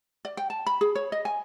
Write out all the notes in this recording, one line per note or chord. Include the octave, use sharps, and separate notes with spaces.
D5
G5
A5
B5
G#4
C#5
D#5
G#5